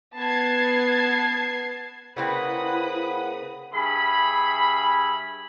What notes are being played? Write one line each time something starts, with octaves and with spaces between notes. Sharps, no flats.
B3 A5 G#6 C7
C#3 A#3 C4 E4 B4 F#5 B5 D#6
G2 G#4 E5 B5